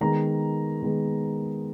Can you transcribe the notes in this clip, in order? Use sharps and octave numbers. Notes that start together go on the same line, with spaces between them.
D#3 G#3 B3 A#5
D#3 G#3 B3